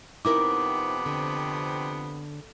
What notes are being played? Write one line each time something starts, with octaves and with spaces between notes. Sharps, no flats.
F2 C3 B3 D#4 E4 A#4 D6
D3